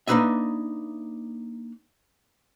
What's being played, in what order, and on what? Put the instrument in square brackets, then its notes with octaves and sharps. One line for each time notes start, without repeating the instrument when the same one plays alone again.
[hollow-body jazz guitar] A#3 D4 D#4 B4 D#5 E5